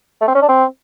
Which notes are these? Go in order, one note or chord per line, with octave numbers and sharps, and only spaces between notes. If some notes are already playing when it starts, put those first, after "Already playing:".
A3
C4
C#4
D4
C4